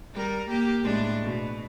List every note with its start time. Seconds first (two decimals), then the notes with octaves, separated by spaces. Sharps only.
0.14 G3 A#4
0.49 A#3 G4
0.83 A2 G#3 D4
1.23 B2